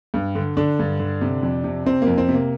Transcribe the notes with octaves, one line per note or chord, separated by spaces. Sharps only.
G2
D3
D3 D4
G2
D3
C3
F2
C3
C3 C4
A#3
F2
C4
C3
A#3